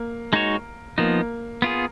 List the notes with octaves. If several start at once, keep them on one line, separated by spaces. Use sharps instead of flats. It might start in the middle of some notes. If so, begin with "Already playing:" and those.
Already playing: A#3
G#3 D#4 F#4 C#5
F3 A#3 B3 D#4
B3 F4 G#4